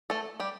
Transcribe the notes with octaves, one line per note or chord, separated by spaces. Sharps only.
A3 A4
G3 G4